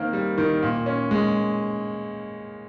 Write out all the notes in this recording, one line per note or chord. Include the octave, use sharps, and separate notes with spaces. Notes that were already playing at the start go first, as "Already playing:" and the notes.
Already playing: D#3 A#3 C4 A#4
G3
D#3
A#2
C#4
G#3